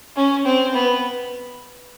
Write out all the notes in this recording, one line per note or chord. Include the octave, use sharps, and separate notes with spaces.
C#4
C4
B3